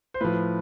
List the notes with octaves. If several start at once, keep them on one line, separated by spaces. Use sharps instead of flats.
C5
A2 F3 B4